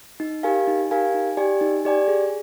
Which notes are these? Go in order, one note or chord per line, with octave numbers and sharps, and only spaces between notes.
D#4
G4 A#4 F5 G#5
D#4
G4 A#4 F5 G#5
D#4
G4 D5 G#5
D#4
G4 D5 G#5
G#4